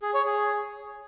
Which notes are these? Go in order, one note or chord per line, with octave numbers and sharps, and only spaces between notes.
G#4
C#5
G#4